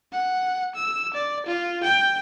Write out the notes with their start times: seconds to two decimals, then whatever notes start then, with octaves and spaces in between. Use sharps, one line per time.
0.13 F#5
0.75 E6
1.14 D5
1.46 F4
1.84 G5